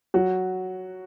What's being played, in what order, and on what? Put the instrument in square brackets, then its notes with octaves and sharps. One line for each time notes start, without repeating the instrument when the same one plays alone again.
[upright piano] F#3 F#4